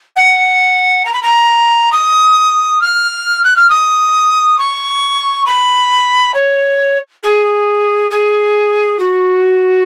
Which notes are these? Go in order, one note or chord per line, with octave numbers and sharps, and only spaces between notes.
F#5
A#5
B5
A#5
D#6
F6
F#6
F6
D#6
C#6
B5
C#5
G#4
G#4
F#4